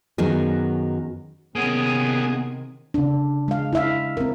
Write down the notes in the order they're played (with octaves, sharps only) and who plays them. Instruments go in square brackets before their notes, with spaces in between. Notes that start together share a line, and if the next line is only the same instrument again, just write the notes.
[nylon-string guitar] F#2 D#3 F#3 B3 D#4 G#4
[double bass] C3 D#3 [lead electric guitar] A#3 C#4 [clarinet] B3 [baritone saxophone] G#4
[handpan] C#3 D4
G#3 F5
E4 E5 F5
C4 A#4